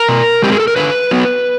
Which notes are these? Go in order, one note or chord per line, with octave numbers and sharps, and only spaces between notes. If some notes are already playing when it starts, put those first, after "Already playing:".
Already playing: A#4
B2
G#3 C4 G4
G#4
A4
A#4
D3 B4
F#3 B3